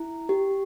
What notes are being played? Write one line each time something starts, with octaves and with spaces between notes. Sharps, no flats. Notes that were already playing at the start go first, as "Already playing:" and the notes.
Already playing: E4
G4